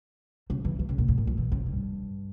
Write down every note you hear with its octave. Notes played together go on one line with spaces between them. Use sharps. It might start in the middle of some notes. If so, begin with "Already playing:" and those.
C#3
E3
E3
C#3
A#2
A2
A#2
F3
E3
C#3
G2